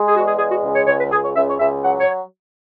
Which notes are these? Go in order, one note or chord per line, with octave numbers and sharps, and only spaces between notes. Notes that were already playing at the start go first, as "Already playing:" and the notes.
Already playing: G#3
G#4
E2 F#4
G#4
G#3 G#4
F#4
C#2
C#5
C#2 C#5
B4
C#2 G#4
C#5
C#2 E5
C#5
C#2 E5
F#3 F#5
C#5